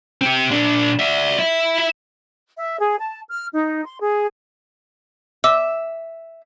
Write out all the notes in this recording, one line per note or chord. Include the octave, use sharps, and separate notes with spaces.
C4 G4
A#2 D4
D5 E5
E4 E5
E5
G#4
A5
F6
D#4
C6
G#4
E5 D6 E6